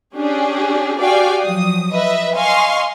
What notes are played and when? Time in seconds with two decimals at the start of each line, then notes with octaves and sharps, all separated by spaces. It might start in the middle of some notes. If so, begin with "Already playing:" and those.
0.15 C#4 D4 G4 G#4
0.98 F#4 G4 D5 F5 G5 G#5
1.42 F3 F#3 D#6
1.93 B4 D#5 E5
2.35 D#5 F5 G#5 C6 C#6